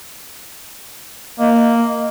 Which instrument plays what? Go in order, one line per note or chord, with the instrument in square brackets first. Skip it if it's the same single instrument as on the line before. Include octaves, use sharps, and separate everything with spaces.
[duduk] A#3 [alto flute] D#5